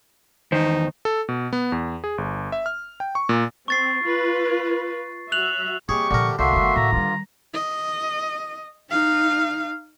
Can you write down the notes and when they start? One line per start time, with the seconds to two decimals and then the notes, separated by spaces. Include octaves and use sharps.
0.52 E2 D#3 D#4 C5
1.05 A4
1.29 B2
1.53 B3
1.72 E2
2.04 G#4
2.18 G1
2.52 E5
2.66 F6
3.00 G5
3.15 C#6
3.29 A#2
3.68 C4 C#6 A6 C7
4.04 F4 B4
5.32 F#3 F#4 E5 F#6 F7 F#7
5.89 C3 G3 A#3 G4 G#4 C#6
6.11 A#2 D3 F3 A#4
6.39 C2 D3 A#3 F#4 E5 C6
6.53 F#1 G#3
6.76 A2 A#5
6.92 G2 D#3 G3 F4
7.54 D#5
8.90 D#4 F5